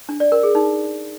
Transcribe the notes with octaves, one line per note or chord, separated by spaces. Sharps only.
D4
D5
A#4
G#4
D#4